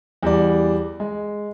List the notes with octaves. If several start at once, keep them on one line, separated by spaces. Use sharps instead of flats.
E2 G3 D5
G#3